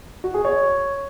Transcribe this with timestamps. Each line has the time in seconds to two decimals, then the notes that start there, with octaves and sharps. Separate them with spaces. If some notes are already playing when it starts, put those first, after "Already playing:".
0.24 F#4
0.34 G#4
0.45 C#5